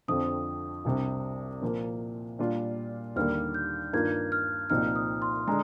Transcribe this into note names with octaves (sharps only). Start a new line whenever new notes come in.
F2 D3 F3 C4 D#6
C2 C3 G3 D4
A#2 F3 A#3
A#2 G3 D4 F4
D#2 D3 G3 A#3 F6
G6
G2 D#3 A#3 F4 G#6
F6
C2 A#2 F3 C4 D#4 F6
D#6
C6
D3 G#3 D4 A#5